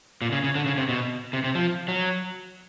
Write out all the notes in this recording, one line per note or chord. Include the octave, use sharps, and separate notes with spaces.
A#2
C#3
C#3
D3
C#3
C3
B2
C3
C3
F3
F#3